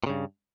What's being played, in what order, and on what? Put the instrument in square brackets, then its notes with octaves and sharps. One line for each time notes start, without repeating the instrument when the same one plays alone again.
[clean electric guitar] A#2
C#3
G2